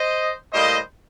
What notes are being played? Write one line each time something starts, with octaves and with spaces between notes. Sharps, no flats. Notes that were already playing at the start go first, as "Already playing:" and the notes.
Already playing: C5 D#5
A2 G3 A#3 C5 D#5